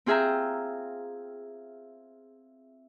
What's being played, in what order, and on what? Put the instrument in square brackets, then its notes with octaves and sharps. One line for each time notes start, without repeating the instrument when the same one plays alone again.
[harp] C4 F4 G#4 E5 G5 A#5